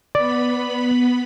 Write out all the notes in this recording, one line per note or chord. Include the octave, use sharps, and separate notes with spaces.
B3 D5 B5